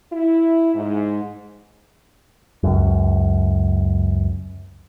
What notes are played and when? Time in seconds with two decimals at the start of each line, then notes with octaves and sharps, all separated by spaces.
0.12 E4
0.75 G#2
2.63 C#2 F#2